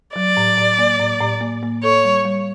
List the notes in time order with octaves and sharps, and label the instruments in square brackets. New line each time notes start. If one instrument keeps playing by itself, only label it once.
[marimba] F#3 [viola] D5
[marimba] A2
A2
A#3
A2
A2
A#3
A#3
[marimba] A4 [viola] C#5
[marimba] G3
G3